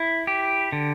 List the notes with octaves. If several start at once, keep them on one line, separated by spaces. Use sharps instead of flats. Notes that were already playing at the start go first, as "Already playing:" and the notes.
Already playing: E4
G4
D3